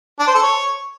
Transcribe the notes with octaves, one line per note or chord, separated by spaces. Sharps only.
D4
C5
A4
C#5